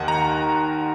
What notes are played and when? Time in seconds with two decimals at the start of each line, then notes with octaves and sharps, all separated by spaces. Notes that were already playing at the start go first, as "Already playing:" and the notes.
Already playing: D#2 D#3 F#5
0.08 A#5